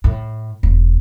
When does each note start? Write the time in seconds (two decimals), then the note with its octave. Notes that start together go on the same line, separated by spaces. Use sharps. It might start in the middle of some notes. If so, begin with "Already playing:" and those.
0.04 A2
0.63 E1